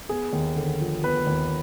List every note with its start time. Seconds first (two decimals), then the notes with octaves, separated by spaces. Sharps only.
0.09 B3 G#4
0.33 D#2
0.56 D3
0.81 F3
1.03 B3 B4
1.27 D#2